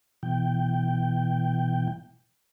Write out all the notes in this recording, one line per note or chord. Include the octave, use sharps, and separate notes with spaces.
B2 E3 G5